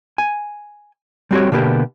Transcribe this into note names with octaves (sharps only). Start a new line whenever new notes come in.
G#5
G3 C4 F#4 G4 C#5
B2 D3 A#3 B3 G4